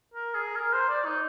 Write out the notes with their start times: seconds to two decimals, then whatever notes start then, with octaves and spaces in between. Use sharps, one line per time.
0.14 A#4
0.35 G#4
0.56 A#4
0.73 C5
0.89 D5
1.05 D#4